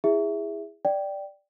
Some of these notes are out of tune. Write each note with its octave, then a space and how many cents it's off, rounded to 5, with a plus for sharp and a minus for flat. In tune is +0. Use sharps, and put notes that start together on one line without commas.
E4 +0 G#4 -20 E5 +0
D5 +0 G5 -10